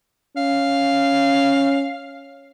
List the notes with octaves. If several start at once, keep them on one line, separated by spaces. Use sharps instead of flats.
C#4 F5